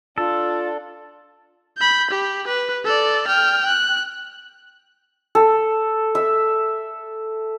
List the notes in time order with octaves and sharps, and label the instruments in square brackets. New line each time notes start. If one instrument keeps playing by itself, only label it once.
[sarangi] D4 [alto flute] F4 [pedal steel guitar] A4
[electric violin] B5 G6
G4
B4
A4 D5
G5 F6
F#6
[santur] A4
E5